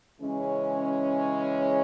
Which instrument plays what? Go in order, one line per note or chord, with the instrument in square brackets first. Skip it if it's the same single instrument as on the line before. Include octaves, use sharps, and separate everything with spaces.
[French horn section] C#3 E3 G#3 C#4